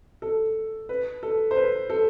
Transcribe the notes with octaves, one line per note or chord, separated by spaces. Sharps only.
A4
B4
A4
C5
B4
A4